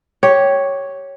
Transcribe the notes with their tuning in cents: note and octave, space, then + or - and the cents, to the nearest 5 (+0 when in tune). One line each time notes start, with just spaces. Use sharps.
G4 -10 C#5 +0